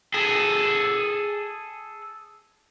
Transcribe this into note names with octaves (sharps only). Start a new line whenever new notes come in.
G#4 A4